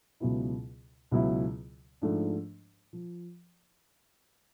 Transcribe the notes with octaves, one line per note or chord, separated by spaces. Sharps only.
C#2 B2 F#3 B3 E4
C#2 B2 F#3 B3 E4
G#2 F3 A3 D4
F3